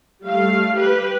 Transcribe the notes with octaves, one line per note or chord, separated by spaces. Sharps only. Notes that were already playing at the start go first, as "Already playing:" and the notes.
G3 A3 F5
G4 B4